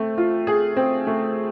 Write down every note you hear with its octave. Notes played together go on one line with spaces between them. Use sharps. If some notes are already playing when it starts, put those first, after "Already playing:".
Already playing: A3 C4
F4
G#4
C4
A3